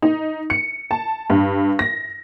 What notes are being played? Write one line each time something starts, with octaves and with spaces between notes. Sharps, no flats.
D#4
C#7
A5
G2
A#6